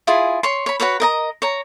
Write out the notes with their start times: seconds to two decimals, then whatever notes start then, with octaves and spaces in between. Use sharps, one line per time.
0.07 E4 F4 G#4 G#5
0.43 C#5 C6
0.66 C#5 B5
0.80 F#4 B4 C#5 B5
1.00 A#4 D#5 A#5
1.42 C#5 A#5